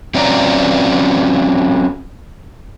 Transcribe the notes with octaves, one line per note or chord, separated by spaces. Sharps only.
F#3 C4 C#4 F4 D5 A#5